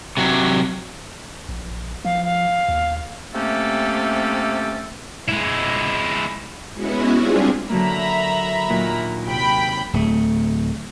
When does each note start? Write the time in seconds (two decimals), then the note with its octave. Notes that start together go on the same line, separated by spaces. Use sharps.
0.17 C3 F#3
1.49 A#1
2.05 F3 F5
2.24 F5
2.68 D#2
3.34 C3 A3 A#3 C#4 G4 A4
5.28 G#3 E4
6.74 G#3 B3 C#4 E4 F#4
7.14 G3 C4 D4 F4 G#4
7.70 D3 F#3 A#3 E5 A#5 B5
8.69 D#2 A#2 F#3
9.27 C3 G5 B5
9.93 D1 A3